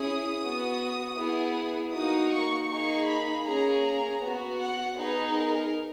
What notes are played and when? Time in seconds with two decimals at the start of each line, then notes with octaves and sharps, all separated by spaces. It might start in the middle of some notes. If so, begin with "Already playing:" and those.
Already playing: C#4 E4 G#4 D#6
0.42 B3 F#4
1.17 B3 E4 G#4
1.93 A#3 D#4 F#4 D#6
2.31 C#6
2.69 A#3 D#4 G#4 C#6
3.07 B5
3.45 A#3 C#4 G#4 A#5
3.83 A#5
4.21 B3 F#4
4.59 F#5
4.97 B3 D#4 G#4 B4
5.35 A#4